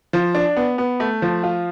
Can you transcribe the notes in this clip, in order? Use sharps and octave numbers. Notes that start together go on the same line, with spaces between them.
F3
D4
B3
B3
A3
F3
F4